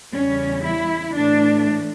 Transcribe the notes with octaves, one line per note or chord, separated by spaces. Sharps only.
E2 C#3 G3 C#4
E4
A2 E3 A3 D4